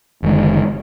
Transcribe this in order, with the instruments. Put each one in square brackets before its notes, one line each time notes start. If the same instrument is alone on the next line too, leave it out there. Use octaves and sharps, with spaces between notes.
[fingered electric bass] F#1 D3 D#3 G#3